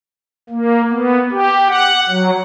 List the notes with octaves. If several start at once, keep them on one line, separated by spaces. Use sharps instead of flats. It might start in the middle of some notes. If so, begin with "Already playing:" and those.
A#3
B3
G4
F#5
F#3